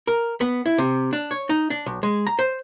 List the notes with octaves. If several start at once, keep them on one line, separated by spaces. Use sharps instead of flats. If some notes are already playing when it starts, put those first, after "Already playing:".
A#4
B3
E4
C3
D4
C#5
D#4
D4
B1
G#3
A#5
C5